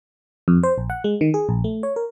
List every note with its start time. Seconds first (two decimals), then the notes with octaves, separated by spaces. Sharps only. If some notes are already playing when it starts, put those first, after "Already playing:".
0.48 F2
0.63 C5
0.78 A#1
0.90 F#5
1.04 G#3
1.21 D#3
1.34 G#4
1.49 A#1
1.64 A3
1.83 C#5
1.96 A#4